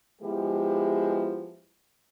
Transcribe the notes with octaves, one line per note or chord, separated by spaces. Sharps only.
F3 G#3 B3 E4 G4